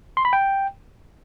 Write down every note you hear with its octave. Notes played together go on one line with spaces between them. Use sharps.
C6
B5
G5